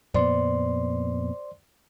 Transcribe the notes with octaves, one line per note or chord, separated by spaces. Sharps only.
F2 A#2 B3 C5 D5 C6